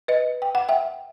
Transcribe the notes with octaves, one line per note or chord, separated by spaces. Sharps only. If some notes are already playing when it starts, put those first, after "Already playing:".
B4 D#5
G5
F#5
E5 G5